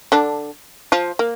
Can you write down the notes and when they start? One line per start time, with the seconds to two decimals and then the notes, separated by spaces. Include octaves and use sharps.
0.12 D3 D4
0.92 F3 F4
1.19 A#3